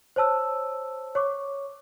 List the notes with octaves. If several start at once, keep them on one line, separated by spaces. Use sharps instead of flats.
C5 C#5 A5 E6
C#5 C#6 D6